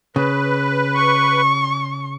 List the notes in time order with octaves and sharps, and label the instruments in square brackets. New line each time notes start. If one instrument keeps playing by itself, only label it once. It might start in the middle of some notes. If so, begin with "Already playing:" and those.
[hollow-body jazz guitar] C#3 [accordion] B4
[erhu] C#6